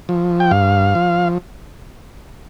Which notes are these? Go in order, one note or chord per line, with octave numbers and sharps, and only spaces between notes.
F3
G5
G2 F5
F3